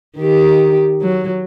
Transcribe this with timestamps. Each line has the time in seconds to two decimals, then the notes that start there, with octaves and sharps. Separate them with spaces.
0.18 D#3 G4
1.02 F#3